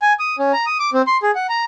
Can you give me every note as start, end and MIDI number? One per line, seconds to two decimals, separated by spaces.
0.02 0.13 80
0.19 0.36 87
0.39 0.52 61
0.53 0.66 82
0.66 0.78 87
0.79 0.90 86
0.93 1.02 60
1.07 1.18 84
1.23 1.31 68
1.35 1.47 78
1.49 1.65 82